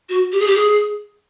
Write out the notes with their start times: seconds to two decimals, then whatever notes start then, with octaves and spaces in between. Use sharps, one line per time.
0.09 F#4
0.32 G4
0.40 G#4
0.47 G4
0.55 G#4